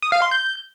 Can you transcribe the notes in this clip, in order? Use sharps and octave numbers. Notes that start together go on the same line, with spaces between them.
D#6
F5
C6
G6